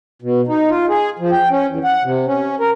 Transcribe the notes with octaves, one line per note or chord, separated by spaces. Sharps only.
B2
D#4
F4
G#4
F3
G5
C#4
E2
F#5
C3
C#4
A#4